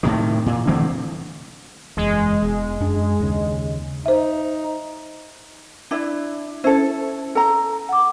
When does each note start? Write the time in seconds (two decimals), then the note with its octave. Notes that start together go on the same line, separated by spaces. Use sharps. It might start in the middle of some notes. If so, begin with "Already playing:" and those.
0.03 A2 C3 D#3
0.46 A#2
0.67 D3 E3 A3 C4
1.97 F#1 E2 G#3
2.42 E1
2.80 F#2 D4
3.20 D#2 C#3
4.06 D#4 C5 E5
5.91 D4 E4
6.64 C#4 E4 A4 C5
7.35 A4 A#5
7.89 F#5 D6